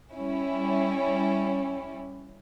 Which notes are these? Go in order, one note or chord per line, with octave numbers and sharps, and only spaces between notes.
G3 C#4 E4